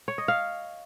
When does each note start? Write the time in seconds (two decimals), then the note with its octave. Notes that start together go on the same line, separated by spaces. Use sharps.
0.08 C#5
0.18 D#5
0.28 F5